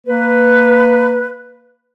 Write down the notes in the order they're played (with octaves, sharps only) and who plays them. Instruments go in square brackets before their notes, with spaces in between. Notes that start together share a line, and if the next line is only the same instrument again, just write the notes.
[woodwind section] A#3 B4